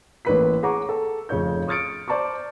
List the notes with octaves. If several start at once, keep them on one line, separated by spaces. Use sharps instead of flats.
A1 A2 A#3 B4 B5 B6
G#4 C#5 F#5 A#5 C#6 D6
A4
F1 C#3 F4 C#5 G6
C#6 D#6 F6 A6 C#7 D7
C5 D5 A5 A#5 C#6